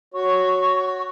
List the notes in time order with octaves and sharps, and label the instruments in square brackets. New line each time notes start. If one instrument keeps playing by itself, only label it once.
[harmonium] F#4 C#5 [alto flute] C#6